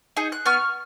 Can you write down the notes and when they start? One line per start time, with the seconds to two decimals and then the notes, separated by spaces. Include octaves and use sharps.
0.17 D#4 G#4
0.32 F#6
0.46 B3 C#6 F6